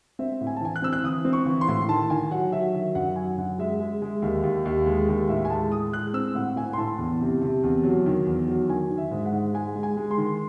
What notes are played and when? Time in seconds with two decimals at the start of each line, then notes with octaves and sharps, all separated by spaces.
0.19 C4 E5
0.41 A2
0.47 G#5
0.56 A5
0.61 E3 G#5
0.76 F#6
0.82 C4 E6
0.93 F#6
1.03 E3 D#6
1.25 C4
1.33 C#6
1.46 E3
1.61 C6
1.68 A2
1.88 D#3 A5
2.10 D#3 G#5
2.31 F#3 F#5
2.52 F#3 E5
2.74 D#3 E5
2.95 F#2 F#5
3.16 F#3 G#5
3.38 F#2 F#5
3.59 G#3 E5
3.80 G#3
4.02 G#3
4.22 D#2
4.43 D#2
4.65 D#2
4.86 G#3
5.08 D#2
5.28 A2 E5
5.45 G#5
5.50 G#3 A5
5.71 A2 D#6
5.93 G#3 F#6
6.14 C4 E6
6.35 A2 F#5
6.56 A2 G#5
6.73 C6
6.78 A2 A5
6.98 E2
7.21 C3
7.42 C3
7.63 E2
7.84 F#3
8.06 D#3
8.26 E2
8.48 F#3
8.69 D#3 G#5
8.90 D#3
8.98 E5
9.11 G#2
9.25 F#5
9.32 G#2
9.54 G#3 G#5
9.76 G#3
9.83 G#5
9.97 G#3
10.11 C6
10.17 D#3